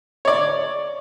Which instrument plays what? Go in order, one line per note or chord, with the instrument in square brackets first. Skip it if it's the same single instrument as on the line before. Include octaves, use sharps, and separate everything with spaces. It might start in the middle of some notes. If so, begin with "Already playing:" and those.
[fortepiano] C#5 D5